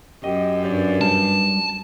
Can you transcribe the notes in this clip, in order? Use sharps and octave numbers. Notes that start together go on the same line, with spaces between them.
F#2 G4 D#5
G2 G4 C#5 D5
G3 A5